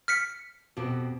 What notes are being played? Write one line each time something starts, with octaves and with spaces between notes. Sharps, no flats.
F6 B6 C#7
F2 B2 G4